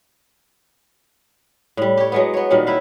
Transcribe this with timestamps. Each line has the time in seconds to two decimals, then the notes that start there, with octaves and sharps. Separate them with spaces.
1.77 A2 G3
1.97 G4 C#5
2.12 F#3 G#3 B3
2.34 B3 C#5
2.50 A#2 D#3 F#3 G3
2.66 E4 B4 F5